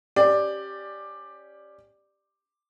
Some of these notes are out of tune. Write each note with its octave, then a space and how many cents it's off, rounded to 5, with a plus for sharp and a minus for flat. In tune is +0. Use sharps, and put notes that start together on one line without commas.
C#4 -5 G4 +0 D5 +10